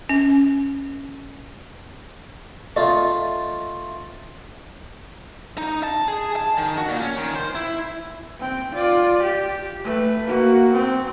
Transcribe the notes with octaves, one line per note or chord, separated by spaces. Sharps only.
C#4
A3 F4 D#5 E5
D#4
A5
G#4
A5
D#3
F#4
A#2
C#4
D#3
C5
E4
C4 G5
F4 D5
G4
A3 B4
A#3 F#4
C4